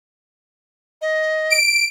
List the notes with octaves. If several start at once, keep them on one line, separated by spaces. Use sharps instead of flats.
D#5
D7